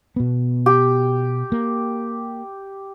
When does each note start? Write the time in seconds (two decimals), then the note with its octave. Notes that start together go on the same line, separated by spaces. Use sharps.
0.16 B2 B3
0.66 G4
1.52 A#3